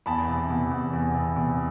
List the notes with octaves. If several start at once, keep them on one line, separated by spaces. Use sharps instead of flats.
E2 A5 B5
C3
E2
E2
E2
C3
E2